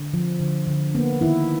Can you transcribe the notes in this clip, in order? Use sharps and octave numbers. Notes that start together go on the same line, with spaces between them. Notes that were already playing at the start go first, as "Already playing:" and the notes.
Already playing: D3
F3
D3
D3
A#3 B3
D#3 E4